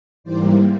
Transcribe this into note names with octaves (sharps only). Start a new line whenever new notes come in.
G#2 E3 G3 A#3 C5 D5